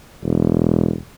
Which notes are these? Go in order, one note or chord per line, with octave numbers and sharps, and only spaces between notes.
E1